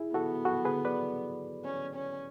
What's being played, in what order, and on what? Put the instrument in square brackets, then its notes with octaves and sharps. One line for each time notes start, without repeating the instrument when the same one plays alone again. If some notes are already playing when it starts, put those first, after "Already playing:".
Already playing: [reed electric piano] E4 G#4
[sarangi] B3 [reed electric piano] F#4 A4
[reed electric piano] F#4 A4
G#4 B4
B4 D5
[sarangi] C#4
C#4